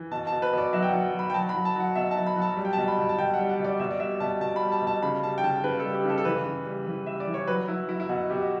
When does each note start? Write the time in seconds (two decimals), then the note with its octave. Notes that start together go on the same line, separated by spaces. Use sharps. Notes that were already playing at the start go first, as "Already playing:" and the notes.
Already playing: E3
0.12 B2 A5
0.27 A5
0.32 B2
0.42 B4
0.53 B2 D5
0.73 F#3 E5
0.83 G5
0.88 F#5
0.93 F#3
1.14 F#3
1.19 B5
1.30 G5
1.34 F#3 A5
1.49 B5
1.54 F#3
1.65 A5
1.76 F#3 F#5
1.96 B2 E5
2.11 A5
2.16 F#3
2.26 B5
2.36 F#3
2.42 A5
2.57 G3
2.65 G5
2.73 A5
2.78 B2
2.88 B5
2.98 B2
3.09 A5
3.18 B2 G5
3.34 F#5
3.39 G3
3.49 F#5
3.59 B2
3.64 D5
3.80 B2 E5
3.91 D5
4.00 G3 E5
4.20 B2 A5
4.41 B2 A5
4.56 B5
4.62 G3
4.72 A5
4.82 B2
4.87 A5
5.03 C#3 B5
5.23 G3 A5
5.38 G5
5.44 C#3 A5
5.64 C#3 B4
5.79 A4
5.84 G3
5.94 G4
6.05 C#3 A4
6.18 A4
6.25 E3 B4
6.46 C#3
6.66 G3
6.87 E3
7.06 G3 E5
7.20 D5
7.27 E3
7.34 C#5
7.48 F#3 B4
7.68 F#3 E4
7.89 F#3 E4
8.00 E4
8.09 B2 F#4
8.30 B2 G4